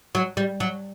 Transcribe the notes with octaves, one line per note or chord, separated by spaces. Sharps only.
F#3
G3
F#3